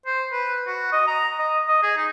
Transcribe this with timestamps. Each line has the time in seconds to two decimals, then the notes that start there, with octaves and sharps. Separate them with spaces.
0.06 C5
0.32 B4
0.67 F#4
0.93 D#5
1.07 A#5
1.39 D#5
1.68 D#5
1.83 G#4
1.97 D#4